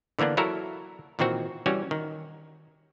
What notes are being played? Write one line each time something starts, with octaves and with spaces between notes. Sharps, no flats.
D3 E3 A#3 B3 D4
F#3 E4 F#4 A4 A#4
A#2 D#3 E3 C4 F#4
E3 G3 C#4 F#4
D#3